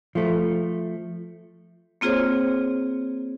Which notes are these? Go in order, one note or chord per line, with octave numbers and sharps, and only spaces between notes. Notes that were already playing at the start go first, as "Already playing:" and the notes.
F3 A3
A#3 C4 F4 G#4 C5 C#5